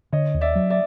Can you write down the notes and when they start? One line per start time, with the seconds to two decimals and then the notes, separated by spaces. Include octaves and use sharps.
0.12 D3 C#5 D#5
0.34 D#2
0.41 D5 E5
0.55 F#3
0.70 D5 E5